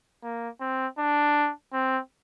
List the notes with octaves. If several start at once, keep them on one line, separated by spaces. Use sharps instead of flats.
A#3
C4
D4
C4